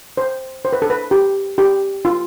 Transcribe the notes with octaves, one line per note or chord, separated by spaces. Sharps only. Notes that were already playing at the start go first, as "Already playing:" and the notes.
C5
C5
B4
A4
B4
G4
G4
F4